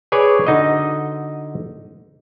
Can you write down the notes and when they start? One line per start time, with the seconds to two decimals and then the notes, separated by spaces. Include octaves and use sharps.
0.12 G#4 B4 C#5 D5 G#5
0.47 D3 D#4 F#4 D#5